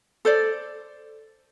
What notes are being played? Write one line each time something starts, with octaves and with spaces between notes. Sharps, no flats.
A4 C5 D5